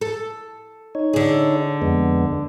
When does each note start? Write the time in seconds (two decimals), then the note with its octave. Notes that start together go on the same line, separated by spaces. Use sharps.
0.01 A4
0.95 D#4 C#5
1.13 D3 G#4
1.82 F2 G#3 B3